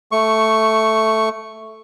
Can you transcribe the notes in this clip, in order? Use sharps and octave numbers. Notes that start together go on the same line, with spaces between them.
A3 C#6